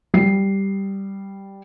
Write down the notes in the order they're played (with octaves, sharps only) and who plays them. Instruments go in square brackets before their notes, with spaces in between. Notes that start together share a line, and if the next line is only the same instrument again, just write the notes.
[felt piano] G3 C7